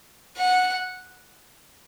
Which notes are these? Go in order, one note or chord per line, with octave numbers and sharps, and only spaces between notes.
F#5